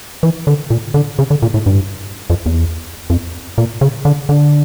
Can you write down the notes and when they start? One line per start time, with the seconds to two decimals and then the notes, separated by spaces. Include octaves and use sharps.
0.23 E3
0.47 D3
0.70 A#2
0.94 D3
1.19 C#3
1.31 D3
1.42 A#2
1.54 A2
1.66 G2
2.30 F2
2.46 E2
3.10 F2
3.58 A#2
3.81 C#3
4.05 D3
4.29 D3